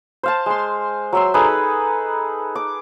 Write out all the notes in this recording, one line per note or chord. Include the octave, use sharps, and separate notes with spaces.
C5 F5 A5
G#3 C6
F#3 E5 C6
D#4 G#4 A4 B4
D6